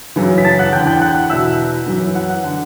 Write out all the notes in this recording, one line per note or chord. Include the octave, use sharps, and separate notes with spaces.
F#2 C#3 E3
B6
A5 A6
F#5 F#6
E2 D3 G5 G6
G5 G6
F#5 F#6
F#6
E2 B2 E5 E6
F#2 E3
F#5 F#6
F#5 F#6
D3